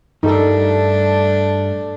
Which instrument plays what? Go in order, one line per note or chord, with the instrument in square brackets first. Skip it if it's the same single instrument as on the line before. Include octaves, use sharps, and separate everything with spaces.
[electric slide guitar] G2 G3 [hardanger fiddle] A3 D4 [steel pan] D#4 A4